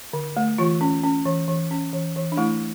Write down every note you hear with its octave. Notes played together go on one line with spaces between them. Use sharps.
D3
A3
E3 F4
C#4
C#4
E3
E3
C#4
E3
E3
D4
A3 E4